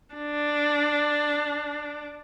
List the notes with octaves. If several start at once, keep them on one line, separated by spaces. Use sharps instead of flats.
D4